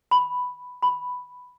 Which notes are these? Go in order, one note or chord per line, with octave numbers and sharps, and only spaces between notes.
B5
B5